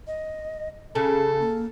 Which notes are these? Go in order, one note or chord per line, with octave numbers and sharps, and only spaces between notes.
D#5
C#3 G#4 A4
A#3